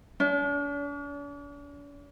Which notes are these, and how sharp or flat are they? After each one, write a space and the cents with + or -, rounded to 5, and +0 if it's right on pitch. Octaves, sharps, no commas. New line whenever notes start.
D4 -45